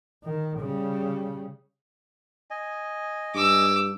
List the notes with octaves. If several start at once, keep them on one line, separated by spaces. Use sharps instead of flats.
D#3
C#3 G3
D#5 G#5
G2 D6 E6